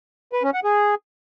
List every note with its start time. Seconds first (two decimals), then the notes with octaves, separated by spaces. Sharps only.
0.33 B4
0.43 C#4
0.54 F#5
0.64 G#4